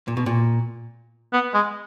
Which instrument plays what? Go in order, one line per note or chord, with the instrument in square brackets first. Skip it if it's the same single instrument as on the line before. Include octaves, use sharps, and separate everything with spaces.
[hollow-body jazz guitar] A#2
B2
A#2
[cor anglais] B3
G#3